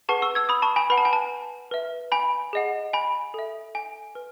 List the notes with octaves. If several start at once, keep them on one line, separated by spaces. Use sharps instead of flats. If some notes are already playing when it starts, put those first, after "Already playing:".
G#4 B4 F#5 A5 C#6
C#6 E6
E6 G#6
B5 D#6
A5 C#6
G#5 B5
B4 F#5 B5
A5
G#5
A5
B4 E5
G#5 B5
G#4 D#5 F#5
G#5 B5
A4 E5
G#5
B4